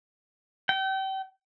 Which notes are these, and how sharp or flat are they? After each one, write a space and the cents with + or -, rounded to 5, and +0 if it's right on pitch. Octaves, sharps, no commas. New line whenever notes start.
G5 -35